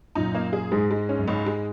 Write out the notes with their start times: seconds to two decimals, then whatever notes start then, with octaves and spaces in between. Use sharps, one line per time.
0.15 F#2 A#2 D#4
0.35 A#3
0.53 G#4
0.72 G#2 G#3
0.91 G#3
1.09 C#4
1.18 F#2
1.28 C#2 G#2
1.46 G#3